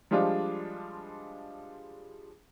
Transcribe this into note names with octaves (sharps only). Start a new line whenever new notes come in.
F3 G3 G#3 D4 F4